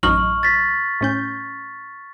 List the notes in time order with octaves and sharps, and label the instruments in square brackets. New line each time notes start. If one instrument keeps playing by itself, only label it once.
[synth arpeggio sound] A1 F#2 D#4 [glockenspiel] C#6 F6 F#7
[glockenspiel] A6 B6
[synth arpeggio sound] A2 C#4 G6